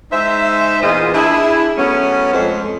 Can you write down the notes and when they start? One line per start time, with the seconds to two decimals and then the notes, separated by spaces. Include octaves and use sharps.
0.12 G#3 D#4 C5 E5
0.82 E2 A#2 E3 F4 G#4 D#5
1.13 D4 E4 G#4
1.77 F#3 A3 B3 C#4
2.33 F2 G#3 C5